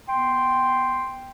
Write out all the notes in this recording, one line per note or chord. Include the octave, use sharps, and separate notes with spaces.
B3 G5 C6